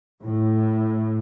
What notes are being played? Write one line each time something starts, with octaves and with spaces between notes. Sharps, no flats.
A2